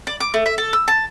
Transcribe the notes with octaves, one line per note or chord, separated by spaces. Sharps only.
D5
D6
A3
E5
A4
E6
A5